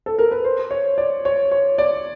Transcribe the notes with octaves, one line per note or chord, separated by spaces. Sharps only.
A4
A#4
B4
C5
C#5
D5
C#5
C#5
D5